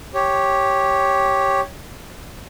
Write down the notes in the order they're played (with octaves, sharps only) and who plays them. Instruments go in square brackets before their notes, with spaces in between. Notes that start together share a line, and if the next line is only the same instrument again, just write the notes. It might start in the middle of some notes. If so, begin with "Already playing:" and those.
[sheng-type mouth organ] G4 C#5